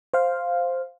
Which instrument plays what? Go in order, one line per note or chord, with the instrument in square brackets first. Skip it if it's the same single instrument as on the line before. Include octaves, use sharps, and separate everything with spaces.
[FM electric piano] C5 F5